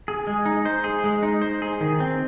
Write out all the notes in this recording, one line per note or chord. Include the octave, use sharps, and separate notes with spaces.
G#4
G#3
D#4
C5
G#4
G#3
D#4
C5
G#4
D#3
C4